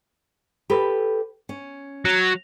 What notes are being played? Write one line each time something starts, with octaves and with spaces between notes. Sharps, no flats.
G4 A4 B4
C#4
F#3